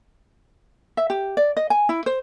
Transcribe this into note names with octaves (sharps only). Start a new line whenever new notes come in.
E5
G4
D5
D#5
G#5
E4
C5